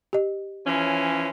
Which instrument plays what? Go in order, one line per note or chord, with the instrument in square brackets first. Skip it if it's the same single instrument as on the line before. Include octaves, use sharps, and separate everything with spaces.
[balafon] G4 D#5
[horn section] E3 F3 C#4